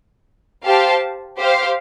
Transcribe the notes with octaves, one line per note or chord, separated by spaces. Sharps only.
G4 C5 F5 A5
G4 C5 F5